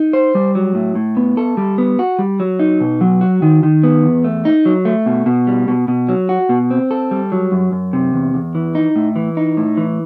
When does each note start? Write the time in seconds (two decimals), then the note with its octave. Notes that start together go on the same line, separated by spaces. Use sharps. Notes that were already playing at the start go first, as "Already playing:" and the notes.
Already playing: D#4
0.13 C5
0.35 G3
0.55 F#3
0.75 A2
0.96 A2
1.17 B3
1.37 A4
1.57 G3
1.78 B3
1.99 F#4
2.19 G3
2.40 F#3
2.59 D#4
2.81 B2
3.01 F#3
3.21 F#4
3.42 D#3
3.63 D#3
3.83 B3
4.03 E2
4.24 A3
4.45 D#4
4.66 F#3
4.85 A3
5.06 B2
5.26 B2
5.47 G3
5.68 B2
5.88 B2
6.09 F#3
6.29 F#4
6.49 B2
6.70 C4
6.91 A4
7.11 G3
7.32 F#3
7.52 F#2
7.72 F#2
7.93 C3
8.14 E2
8.34 E2
8.55 E3
8.75 D#4
8.96 A2
9.16 E3
9.37 D#4
9.57 A2
9.77 E3